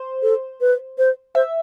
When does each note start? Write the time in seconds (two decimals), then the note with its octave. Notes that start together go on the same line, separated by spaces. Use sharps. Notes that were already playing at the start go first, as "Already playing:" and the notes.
Already playing: C5
0.22 A4
0.61 B4
0.98 C5
1.35 C5 E5